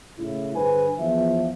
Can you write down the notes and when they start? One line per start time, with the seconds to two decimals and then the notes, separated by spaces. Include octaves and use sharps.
0.18 A2 C#3 E4
0.56 G2 D3 G#4 B4 C5 G#5
0.99 E2 F3 E5